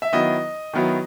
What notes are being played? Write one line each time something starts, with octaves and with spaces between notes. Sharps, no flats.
E5
D#3 F#3 B3 E4 D#5
D#3 F#3 B3 E4